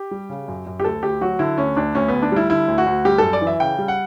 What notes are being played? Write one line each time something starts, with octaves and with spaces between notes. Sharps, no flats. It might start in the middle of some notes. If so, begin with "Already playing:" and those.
Already playing: G4
G3
C#3
F#2
F#2
G4
D2 A4
D2 G4
F#3 F#4
D3 E4
D2 C#4
D2 D4
D2 C#4
B3
D2
D4
G3 E4
D3 E4
D2
F#4
D2
G3 G4
F#2 A4
D5
E3
E5
C#3 G5
G3
F#5